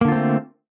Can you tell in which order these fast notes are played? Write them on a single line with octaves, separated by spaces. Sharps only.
A#3 D3 F4 C4 A3